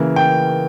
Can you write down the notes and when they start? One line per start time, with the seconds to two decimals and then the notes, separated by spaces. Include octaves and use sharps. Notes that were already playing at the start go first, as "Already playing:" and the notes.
Already playing: C#3 E3 A#3
0.16 G5